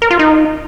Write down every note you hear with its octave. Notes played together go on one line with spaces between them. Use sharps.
A#4
F4
D#4